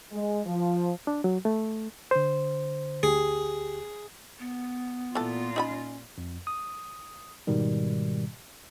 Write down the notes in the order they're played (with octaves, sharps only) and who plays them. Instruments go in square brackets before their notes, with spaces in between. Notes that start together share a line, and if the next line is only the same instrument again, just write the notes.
[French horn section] G#3
F3
[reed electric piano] D4
F#3
A3
D3 C5
[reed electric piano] D2 G4 [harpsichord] G#4
[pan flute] B3
[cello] A#2 F4 [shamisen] E3 A4
[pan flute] C#4 [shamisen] D#4 E5 B5
[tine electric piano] F2
D#6
G#2 B2 D#3 G3